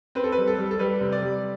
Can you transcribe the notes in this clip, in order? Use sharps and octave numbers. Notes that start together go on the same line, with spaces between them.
C4 B4
A4
B4
G3
A4
G3
A4
G3 B4
C3
D5
G3